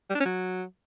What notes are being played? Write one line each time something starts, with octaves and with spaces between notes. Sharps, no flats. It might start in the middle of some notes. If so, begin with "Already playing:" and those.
G3
D4
C#4
F#3